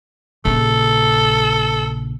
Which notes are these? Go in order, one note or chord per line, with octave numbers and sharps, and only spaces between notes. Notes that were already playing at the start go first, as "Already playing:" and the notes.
A#1 C#3 A4